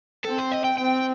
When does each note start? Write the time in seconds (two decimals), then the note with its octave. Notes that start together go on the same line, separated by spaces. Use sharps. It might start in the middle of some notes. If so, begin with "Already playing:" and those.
0.25 C4 A4
0.38 C5
0.51 D#5
0.64 G5
0.77 C4 G5